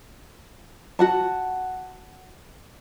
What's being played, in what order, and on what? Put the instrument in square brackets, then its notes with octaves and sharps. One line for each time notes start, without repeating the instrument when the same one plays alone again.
[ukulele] F#4 F#5 A5